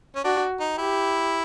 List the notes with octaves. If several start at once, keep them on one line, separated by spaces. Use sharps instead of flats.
C#4
D4 F#4
D#4
E4 G4